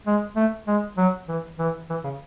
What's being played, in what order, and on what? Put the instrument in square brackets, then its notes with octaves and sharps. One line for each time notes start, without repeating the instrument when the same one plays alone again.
[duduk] G#3
A3
G#3
F#3
E3
E3
E3
C#3